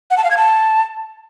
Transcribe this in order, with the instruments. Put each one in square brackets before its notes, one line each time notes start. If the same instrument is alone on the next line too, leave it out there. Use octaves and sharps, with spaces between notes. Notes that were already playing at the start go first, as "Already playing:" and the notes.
[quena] F#5
A5
F5
G#6
A5